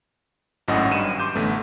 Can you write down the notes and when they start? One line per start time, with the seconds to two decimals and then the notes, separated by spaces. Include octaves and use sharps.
0.68 G#1 F#2 A2 C#4 D#5 F#5
0.91 G2 D#7 E7
1.20 C6 D6 G6
1.35 A1 D3 A3 B3